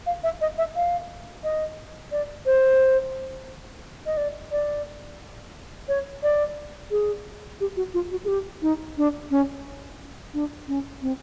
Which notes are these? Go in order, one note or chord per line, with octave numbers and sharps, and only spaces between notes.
F5
E5
D#5
E5
F5
D#5
D5
C5
D#5
D5
D5
C#5
D5
G#4
G4
F#4
F4
F#4
G#4
G4
D#4
D4
C#4
D4
C#4
C4